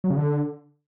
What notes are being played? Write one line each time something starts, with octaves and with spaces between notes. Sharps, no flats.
F#3
C#3
D3